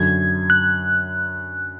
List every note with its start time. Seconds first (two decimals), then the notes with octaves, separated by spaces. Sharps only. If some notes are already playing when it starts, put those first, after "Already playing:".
Already playing: F#2 D3 F#3 G#6
0.50 F#6